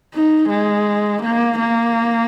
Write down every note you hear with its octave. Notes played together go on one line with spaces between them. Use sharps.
D#4
G#3
A#3
A#3